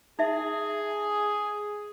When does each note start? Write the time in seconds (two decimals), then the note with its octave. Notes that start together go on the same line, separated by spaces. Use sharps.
0.19 D#4 G#4 E5